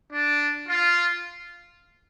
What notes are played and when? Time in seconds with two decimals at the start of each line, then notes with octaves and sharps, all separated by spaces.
0.13 D4
0.68 F4